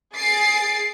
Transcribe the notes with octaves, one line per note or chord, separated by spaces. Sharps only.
G#4 A6 C7 D7